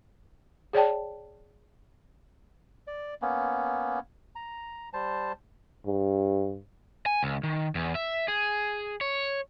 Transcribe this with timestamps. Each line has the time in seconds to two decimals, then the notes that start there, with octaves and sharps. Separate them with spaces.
0.73 G#4 C#5 D5 G5 A5
2.87 D5
3.22 A#3 B3 C#4
4.35 A#5
4.93 G3 C5 A5
5.87 G2
7.06 G#5
7.23 C#2
7.43 D#3
7.75 E2
7.95 E5
8.28 G#4
9.01 C#5